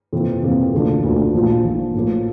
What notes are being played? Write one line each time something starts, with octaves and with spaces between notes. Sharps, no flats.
F2 C3 E3 A#3
F2 C3 E3 A#3
D2 D3 F3 A#3 D4
D2 D3 F3 A#3 D4
A#1 A#2 F3
A#1 A#2 F3
A2 F3 A#3